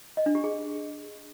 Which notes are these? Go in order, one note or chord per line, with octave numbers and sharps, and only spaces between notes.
D#5
D4
G4
G#4